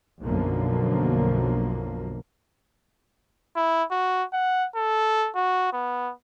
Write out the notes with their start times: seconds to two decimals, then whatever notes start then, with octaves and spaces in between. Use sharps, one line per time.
0.23 B1 F#2 D3 F3 A#3
3.56 E4
3.91 F#4
4.33 F#5
4.75 A4
5.35 F#4
5.73 B3